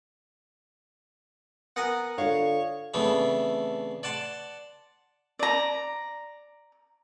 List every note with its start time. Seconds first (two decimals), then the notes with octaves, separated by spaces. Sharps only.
1.76 B3 A#4 F#5 G#5
2.18 D3 F4 C#5 F5
2.94 C#3 E3 A3 B3 C4 D4
4.03 D5 F#5 A5 C6
5.39 D5 A#5